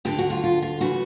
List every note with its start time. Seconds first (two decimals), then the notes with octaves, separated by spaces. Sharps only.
0.05 D2 D3 G4
0.18 F#4
0.30 F4
0.44 F4
0.62 F4
0.81 C#3 E3 F#4